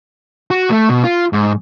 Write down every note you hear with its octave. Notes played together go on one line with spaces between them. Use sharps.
F#4
A3
B2
F4
G#2